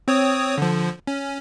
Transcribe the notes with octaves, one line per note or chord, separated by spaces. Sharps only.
C4 C#5 D#6
D3 F3
C#4